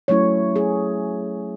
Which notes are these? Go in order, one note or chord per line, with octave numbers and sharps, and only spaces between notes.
F#3 A3 C#4 E4 C#5
G#4